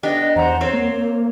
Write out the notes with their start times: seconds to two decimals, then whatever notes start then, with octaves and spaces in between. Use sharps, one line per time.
0.03 B3 D4 G4 D#5
0.36 E2 C5 F#5 A#5
0.61 C4 C5 C#5
0.73 A#3